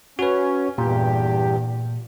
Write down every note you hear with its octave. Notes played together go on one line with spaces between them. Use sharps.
C#4 F#4 B4
E2 G2 A#2 G4